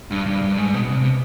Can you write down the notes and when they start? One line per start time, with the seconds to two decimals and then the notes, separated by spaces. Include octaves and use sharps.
0.11 G2
0.26 G2
0.42 G2
0.58 G#2
0.74 B2
0.90 C3